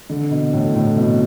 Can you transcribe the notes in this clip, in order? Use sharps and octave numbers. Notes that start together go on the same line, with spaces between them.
D3
B2
A2
A2
B2